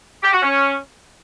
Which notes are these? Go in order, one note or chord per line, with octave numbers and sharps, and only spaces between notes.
G4
F#4
C#4